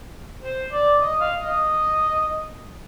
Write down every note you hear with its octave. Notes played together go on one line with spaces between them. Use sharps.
C5
D5
D#5
F5
D#5